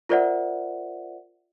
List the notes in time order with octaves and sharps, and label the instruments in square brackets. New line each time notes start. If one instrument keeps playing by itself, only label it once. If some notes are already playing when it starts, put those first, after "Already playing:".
[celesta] F4 A#4 C5 D5 E5 F#5